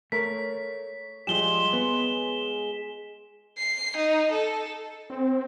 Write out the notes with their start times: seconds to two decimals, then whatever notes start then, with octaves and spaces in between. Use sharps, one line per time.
0.12 A3 A#4 C#5 B6
1.27 F3 G3 G#3 F4 G4 G#4 E7 G7
1.73 B3
3.58 C7
3.97 D#4
4.31 A4
5.10 C4